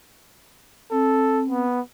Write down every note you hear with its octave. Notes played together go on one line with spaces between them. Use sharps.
C4 A4
B3